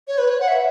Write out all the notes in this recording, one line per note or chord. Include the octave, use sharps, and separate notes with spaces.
C#5
B4
C#5
F#5
E5